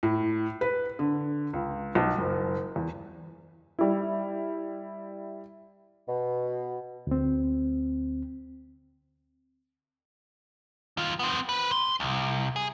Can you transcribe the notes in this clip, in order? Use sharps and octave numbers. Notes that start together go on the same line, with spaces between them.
A2
B4
D3
C#2
B1
F#1
E2
G3 E4
B2
D2 C4
D#3 F4
B3 C4
B4 C5
C6
C2
G#4